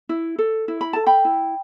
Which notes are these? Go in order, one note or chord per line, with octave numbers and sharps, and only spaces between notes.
E4
A4
E4
B5
A4 A5
G5 B5
E4